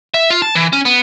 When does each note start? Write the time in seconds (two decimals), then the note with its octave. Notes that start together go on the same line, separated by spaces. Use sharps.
0.14 E5
0.30 F4
0.42 A5
0.55 E3
0.73 C#4
0.85 B3